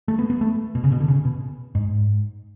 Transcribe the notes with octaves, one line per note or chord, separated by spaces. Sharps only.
A3
B3
B3
A3
B2
C#3
B2
D3
C#3
B2
G#2